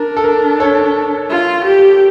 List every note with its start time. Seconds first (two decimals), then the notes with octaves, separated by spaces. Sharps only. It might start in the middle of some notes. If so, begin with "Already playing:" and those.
Already playing: D4 A#4
0.17 A4
0.24 A#4
0.60 A4 C#5
1.30 F4
1.65 G4